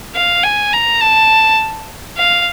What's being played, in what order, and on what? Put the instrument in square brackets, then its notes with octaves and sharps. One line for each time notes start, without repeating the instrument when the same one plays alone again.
[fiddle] F5
G#5
A#5
A5
F5